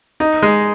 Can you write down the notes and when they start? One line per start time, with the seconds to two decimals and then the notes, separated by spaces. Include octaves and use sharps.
0.20 D#4
0.42 G#3